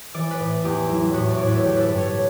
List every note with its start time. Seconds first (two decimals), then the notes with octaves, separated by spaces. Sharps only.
0.14 E3 D5
0.31 B4
0.39 A2
0.64 E2 G4
0.89 F#3 E4
1.14 A2 F#4
1.30 D5
1.38 A2 C#5
1.47 B4
1.56 A4
1.64 D3 G4
1.76 A4 B4
1.89 G2
1.98 C#5